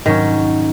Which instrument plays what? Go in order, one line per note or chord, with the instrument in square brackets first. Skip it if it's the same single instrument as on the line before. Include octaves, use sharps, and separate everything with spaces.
[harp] G#2 F#3 C#4 [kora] D#3